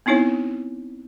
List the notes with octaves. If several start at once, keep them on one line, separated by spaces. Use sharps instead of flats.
B3 C4 D#4 E4 C#5